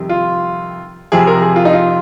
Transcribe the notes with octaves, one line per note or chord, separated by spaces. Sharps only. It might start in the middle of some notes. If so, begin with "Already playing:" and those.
Already playing: F2 C3 D#3 G3
F4
F2 C3 F3 G#4
A#4
G#4
F4
D#4
F4